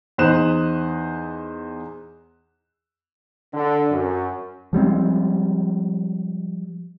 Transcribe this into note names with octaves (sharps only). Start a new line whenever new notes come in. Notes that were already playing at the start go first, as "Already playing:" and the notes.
E2 D#4 C5 D#6 F#6 E7
D3
F#2
F3 G3 G#3 C4